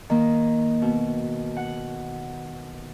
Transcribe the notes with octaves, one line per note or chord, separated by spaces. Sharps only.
D#3 A#3
B2
F#5